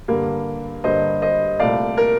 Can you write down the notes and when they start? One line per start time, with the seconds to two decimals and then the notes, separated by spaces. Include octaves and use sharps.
0.08 G2 D3 G3 A#3
0.84 G2 D3 G3 A#3 C5 D#5
1.22 C5 D#5
1.59 C2 A#2 A3 D5 F5
1.97 A#4